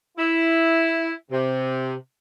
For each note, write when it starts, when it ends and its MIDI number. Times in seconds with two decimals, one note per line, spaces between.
0.17 1.11 64
1.31 1.93 48